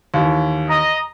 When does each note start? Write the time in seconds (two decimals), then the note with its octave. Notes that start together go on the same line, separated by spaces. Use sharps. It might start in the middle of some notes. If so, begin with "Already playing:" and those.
0.14 D#2 E3
0.70 D#5 A#5